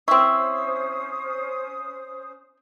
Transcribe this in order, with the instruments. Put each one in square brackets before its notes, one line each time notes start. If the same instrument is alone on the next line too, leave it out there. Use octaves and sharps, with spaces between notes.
[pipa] C4 E4 [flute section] C#4 C5 D#6 [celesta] C#6